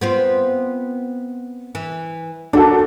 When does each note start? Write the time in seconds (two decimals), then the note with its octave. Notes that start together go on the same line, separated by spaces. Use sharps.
0.01 B3 C4 F4
1.75 E3
2.53 D#3 D4 F#4 A4